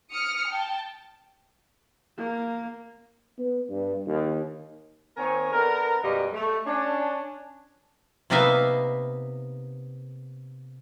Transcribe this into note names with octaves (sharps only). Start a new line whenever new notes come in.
D#6 F6 C#7
G5 A5
A#3
B3
G2
D#2
D#3 A#3 C4 A#4 C#5 G#5
B3 D4 A4 A#4
F#2 B2 F#3 G3 D#5 F5
A3
C#4 D4
C3 A#3 B3 D#4 E5 F5